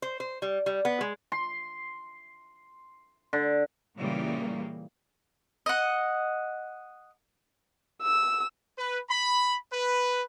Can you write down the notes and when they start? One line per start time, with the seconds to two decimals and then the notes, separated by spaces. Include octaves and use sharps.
0.02 C5
0.20 C5
0.42 G3
0.66 G3
0.85 B3
1.01 G#3
1.32 C6
3.33 D3
3.97 A#2 C#3 E3 G3 A#3
5.66 D#5 F#5
8.02 E6
8.77 B4
9.09 B5
9.72 B4